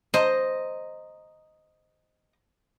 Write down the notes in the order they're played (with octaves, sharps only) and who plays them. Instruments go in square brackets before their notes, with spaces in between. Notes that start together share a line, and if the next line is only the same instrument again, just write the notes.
[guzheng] C5 [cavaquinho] D#5 A#5